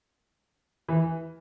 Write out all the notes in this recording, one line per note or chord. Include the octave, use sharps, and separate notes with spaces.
E3